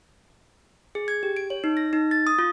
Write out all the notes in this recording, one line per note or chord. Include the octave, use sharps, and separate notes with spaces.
G#4
G#6
G4
D7
C#5
D#4
A#6
D#4
A6
D#6
F4